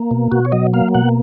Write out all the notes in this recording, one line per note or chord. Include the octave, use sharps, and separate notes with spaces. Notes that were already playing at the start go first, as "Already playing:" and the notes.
Already playing: A#3
B2
B2 F#4
C#5
F#3 D#5
A#3 F5
B2 F#5